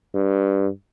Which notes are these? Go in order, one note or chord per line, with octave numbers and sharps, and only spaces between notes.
G2